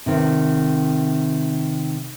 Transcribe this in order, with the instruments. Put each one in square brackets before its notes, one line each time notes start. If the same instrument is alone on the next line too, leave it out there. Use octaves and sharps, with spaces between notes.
[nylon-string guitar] C3 D#3